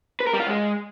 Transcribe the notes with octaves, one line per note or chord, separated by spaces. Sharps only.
B4
A#4
G3
F4
G#3